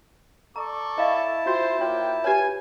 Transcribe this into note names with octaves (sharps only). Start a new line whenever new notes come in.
A4 D5 A#5 C#6
E4 D#5 F5 A5
F4 F#4 C5 G5
A#3 F4 C#5 G5
G4 B4 C#5 G#5